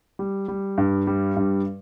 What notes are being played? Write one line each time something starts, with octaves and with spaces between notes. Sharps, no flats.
G3
G3
G2
G3
G2